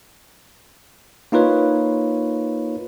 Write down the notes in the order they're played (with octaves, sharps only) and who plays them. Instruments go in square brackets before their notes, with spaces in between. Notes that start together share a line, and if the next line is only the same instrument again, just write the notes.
[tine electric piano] A#3 D#4 F4 B4 C#5